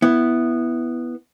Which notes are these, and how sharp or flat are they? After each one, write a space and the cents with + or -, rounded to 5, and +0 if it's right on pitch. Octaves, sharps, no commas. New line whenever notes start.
B3 +0 E4 +0